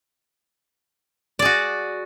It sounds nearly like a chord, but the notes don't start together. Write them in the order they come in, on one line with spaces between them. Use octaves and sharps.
D5 G#4 F#4